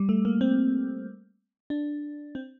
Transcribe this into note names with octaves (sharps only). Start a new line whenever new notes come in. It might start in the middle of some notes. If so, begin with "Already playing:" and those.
Already playing: G3
A3
A#3
C4
D4
C4